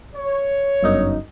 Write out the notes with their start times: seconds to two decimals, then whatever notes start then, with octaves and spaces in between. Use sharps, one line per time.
0.15 C#5
0.83 G1 F#2 D#4